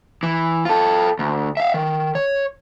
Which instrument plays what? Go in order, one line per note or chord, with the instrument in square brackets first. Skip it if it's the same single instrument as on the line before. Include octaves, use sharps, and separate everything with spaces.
[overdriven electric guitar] E3
F4 A4
D2
E5 F5
D#3
C#5